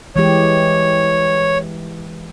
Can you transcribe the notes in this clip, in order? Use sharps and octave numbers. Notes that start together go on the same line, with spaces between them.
E3 G#3 G4 C#5